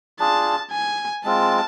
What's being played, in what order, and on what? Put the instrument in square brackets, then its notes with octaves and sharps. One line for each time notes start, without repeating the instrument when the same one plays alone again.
[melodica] D4 F4 G#4 [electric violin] A5
[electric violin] G#5
[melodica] G#3 C4 F4 [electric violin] A5